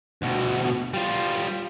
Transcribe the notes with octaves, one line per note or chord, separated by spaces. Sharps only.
D2 B2
G3 F4